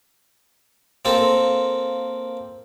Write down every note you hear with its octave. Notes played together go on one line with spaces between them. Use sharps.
A#3 C4 A4